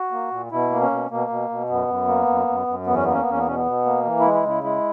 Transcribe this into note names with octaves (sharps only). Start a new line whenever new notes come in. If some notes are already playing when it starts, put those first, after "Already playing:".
Already playing: F#4
A#3
A#2
B2 E4
A#3
C#4
B2
B2 A#3
B2
B2
F#2 B3
F#2
A#3
F#2
F#2
F#2
E2 B3
C#4
A#3 B3
C#4
B3
E2 C#4
B3
B2 C#4
B3
B2
A#3
E3
G#3 E4
E4
C#3 E4
G#3 E4